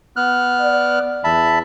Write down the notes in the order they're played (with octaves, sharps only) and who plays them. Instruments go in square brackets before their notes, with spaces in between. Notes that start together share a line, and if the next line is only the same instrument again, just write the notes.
[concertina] B3 F6 F#6
[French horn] D5
[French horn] E2 [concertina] E5 A5 B5